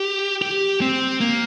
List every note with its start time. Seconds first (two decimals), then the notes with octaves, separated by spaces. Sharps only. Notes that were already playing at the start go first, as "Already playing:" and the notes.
Already playing: G4
0.42 G4
0.81 C4
1.21 A#3